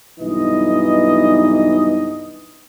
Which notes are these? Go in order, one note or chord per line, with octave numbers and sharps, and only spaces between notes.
B1 G2 E3 D#4 D#5